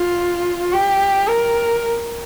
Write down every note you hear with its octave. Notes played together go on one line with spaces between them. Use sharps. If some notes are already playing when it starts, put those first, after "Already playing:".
Already playing: F4
G4
A#4